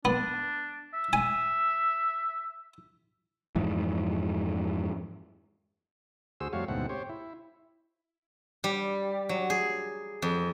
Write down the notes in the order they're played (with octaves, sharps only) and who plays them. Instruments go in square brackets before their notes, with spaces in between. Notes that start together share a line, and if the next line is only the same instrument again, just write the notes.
[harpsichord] B3 [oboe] D4
[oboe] E5
[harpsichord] G#5
[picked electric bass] F2 G#2 E3
[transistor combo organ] D2 F#4 G#4 C5 E6
F2 G3 A3 F#4 C#5 F5
D2 G#2 B2 A3 C4 F#5
G4 C5 C#5
E4
[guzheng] G3
F#3
G#4
F2